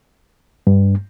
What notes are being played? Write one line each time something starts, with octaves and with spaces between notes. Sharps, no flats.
G2